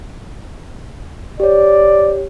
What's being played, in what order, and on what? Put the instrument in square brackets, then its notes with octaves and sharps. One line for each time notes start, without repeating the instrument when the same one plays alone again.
[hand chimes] G4 C#5 [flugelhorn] D5